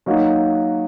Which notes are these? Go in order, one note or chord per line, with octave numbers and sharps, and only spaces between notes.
F#3 A#3 D#4 F#4